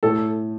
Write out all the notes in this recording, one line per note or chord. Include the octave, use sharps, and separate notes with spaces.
A2 A4